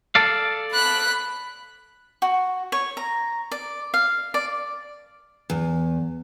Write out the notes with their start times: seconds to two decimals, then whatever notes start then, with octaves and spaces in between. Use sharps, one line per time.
0.15 A4 D5 F5
0.71 B5 F#6
2.22 F#4
2.72 C#5
2.97 A#5
3.51 D5
3.94 F5
4.34 D5
5.50 E2